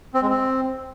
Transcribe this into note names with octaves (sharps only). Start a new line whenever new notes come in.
C4
G#3
C4